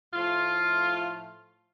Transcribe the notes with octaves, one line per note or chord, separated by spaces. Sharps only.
A2 F3 A3 F4